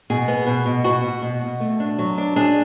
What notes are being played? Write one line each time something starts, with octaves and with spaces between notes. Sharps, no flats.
B2 G#4
B3
B2
B2
B2 F#4
B2
B2
B2
A3
D4
F#3
D4
D4 G#4